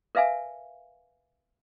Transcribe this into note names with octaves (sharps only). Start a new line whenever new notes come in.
A#4 B4 E5 F5 G#5